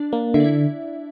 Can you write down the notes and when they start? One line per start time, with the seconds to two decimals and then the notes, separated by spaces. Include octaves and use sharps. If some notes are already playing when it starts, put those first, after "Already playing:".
Already playing: D4 D5
0.13 A#3
0.34 D3 E4 E5
0.40 D5
0.44 E4 E5